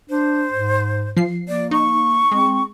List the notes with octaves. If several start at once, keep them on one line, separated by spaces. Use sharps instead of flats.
D4 C5
G#2
F3 C7
A#3 D5
D#4 C#6
G#3 C4